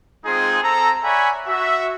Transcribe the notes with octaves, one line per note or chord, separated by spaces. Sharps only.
G#3 C4 D#4 F4 G#4
C4 A4 A#5
C#5 D5 E5 F#5 G#5 B5
F#4 E5